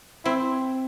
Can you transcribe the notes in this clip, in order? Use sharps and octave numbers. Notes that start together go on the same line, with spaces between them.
C4 E4